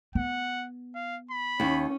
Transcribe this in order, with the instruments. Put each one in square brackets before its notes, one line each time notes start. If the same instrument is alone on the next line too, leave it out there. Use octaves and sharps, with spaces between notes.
[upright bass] B3 [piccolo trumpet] F#5
[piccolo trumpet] F5
B5
[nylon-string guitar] D#2 [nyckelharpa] C#4